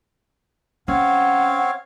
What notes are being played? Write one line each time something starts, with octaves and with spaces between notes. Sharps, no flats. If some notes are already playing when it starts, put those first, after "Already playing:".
C4 C#4 C#5 F5 F#5